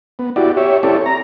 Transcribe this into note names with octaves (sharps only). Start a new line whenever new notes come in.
B3
E4 F#4 G4 D5
G4 C#5 E5
C4 E4 G4 A4 C#5 D5
A#5